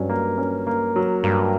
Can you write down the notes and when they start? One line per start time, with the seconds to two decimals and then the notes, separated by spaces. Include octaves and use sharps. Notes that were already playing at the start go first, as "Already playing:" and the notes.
Already playing: G2 F#3 C#4
0.09 A#3
0.38 C#4
0.67 A#3
0.96 F#3
1.24 G2 A#3